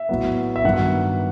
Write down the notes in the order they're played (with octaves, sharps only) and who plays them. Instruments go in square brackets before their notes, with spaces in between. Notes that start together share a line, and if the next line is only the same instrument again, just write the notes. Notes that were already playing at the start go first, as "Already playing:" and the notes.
Already playing: [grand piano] E5
A2 F#3 B3
E5
G2 D#3 F#3 B3 F#5